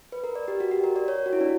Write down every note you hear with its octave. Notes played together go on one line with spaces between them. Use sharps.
B4
A#4
D5
G4
F#4
G4
A#4
D5
C#5
F#4
E4
D4